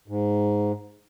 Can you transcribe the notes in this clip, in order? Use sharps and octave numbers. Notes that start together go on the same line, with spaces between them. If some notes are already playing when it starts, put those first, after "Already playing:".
G#2